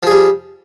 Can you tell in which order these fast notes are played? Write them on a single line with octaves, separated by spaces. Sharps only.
F3 G#4 G3